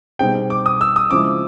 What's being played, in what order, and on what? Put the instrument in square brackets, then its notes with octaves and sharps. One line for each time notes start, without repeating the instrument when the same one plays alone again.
[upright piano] B2 G3 C4 D#4 G#4 [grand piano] G5
[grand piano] D6
D#6
E6
D#6
[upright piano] C#3 F3 G#3 C4 E4 [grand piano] D6